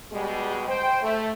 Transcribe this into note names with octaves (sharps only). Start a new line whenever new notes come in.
B2 G3 G#3
C5 G5
A3